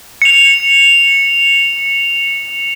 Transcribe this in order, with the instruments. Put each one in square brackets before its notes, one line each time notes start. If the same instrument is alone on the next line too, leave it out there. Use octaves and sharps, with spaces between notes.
[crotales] C#7 F7